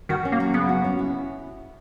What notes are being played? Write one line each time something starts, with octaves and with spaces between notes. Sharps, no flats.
D#3 F#4
C#4
A#3
F#3
C#3 B3
F#4
C#4
E4